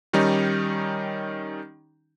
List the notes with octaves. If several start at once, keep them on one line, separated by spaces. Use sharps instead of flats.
D#3 G3 C#4 D#4